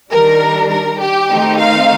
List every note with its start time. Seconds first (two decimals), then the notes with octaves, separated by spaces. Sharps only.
0.11 D#3 G3 D4 A#4
0.70 A#4
1.00 G4
1.30 D#3 A3 C4 D#4
1.60 F5